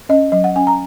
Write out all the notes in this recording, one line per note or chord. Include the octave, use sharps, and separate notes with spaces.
C#4 D#5
F#3 D#5
F#5
C#4 G#5
A#5